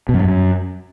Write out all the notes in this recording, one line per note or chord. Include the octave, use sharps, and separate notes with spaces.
B2
F#2
G2
F#2